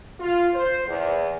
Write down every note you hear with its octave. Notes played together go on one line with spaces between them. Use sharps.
F4
C5
E2